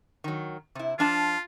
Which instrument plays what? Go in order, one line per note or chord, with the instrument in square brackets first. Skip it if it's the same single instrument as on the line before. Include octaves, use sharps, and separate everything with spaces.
[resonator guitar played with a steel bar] D#3 F#3
C3 E4
[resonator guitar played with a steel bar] F3 D4 A5 [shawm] F4